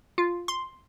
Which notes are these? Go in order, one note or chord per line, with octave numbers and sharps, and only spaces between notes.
F4
C6